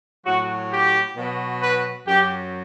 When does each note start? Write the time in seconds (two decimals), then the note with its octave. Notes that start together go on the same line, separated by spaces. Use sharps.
0.26 A2 F#3 F#4
0.72 G4
1.17 B2 F#3
1.62 B4
2.07 F#2 F#3 G4